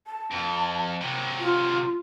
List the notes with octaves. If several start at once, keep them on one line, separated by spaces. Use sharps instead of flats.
A5
F2
C3 F#3
F4